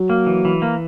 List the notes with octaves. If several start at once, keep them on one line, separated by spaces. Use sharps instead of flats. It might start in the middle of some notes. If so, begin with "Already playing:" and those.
Already playing: F#3
A#3
E3
E3
A#3